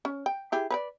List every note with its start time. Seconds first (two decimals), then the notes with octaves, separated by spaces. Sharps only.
0.05 C#4
0.26 G5
0.52 E4 G4 G#4
0.70 B4 C#5 D5